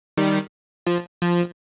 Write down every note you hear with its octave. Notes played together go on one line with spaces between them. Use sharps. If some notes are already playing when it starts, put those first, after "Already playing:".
D#3 G3
F3
F3